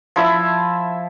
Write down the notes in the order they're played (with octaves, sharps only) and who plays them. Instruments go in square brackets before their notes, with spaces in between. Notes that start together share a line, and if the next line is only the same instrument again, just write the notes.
[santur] F3 E4 E5